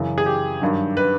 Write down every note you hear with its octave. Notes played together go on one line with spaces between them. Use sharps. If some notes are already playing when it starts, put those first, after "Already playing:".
Already playing: F#2 C#3 E3
G#4
G4
G2 D#3 F#3
B4